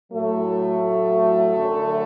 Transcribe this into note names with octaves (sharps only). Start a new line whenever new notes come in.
A2 F#3 A3
F#2 D3 F#3